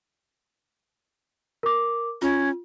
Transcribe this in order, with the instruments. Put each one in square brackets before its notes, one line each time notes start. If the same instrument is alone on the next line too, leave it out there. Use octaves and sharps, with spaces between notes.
[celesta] A#4 D6
[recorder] C#4 [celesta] F4